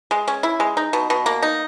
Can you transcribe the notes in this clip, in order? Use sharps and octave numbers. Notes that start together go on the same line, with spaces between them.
G#3
C#4
E4
G#3
D#4
B2
B2
A#3
D#4